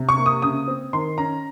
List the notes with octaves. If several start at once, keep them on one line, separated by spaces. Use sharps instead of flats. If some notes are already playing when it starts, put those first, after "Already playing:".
Already playing: C3
C#6
A#3
D#6
C#3 D#6
C4
D#3 C6
C#4 A#5